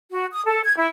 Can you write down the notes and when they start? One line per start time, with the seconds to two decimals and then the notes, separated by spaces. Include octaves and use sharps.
0.11 F#4
0.33 D#6
0.46 A4
0.65 G#6
0.77 E4